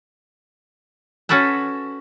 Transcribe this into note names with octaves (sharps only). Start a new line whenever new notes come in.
C#4 F#4 A4 B4 A5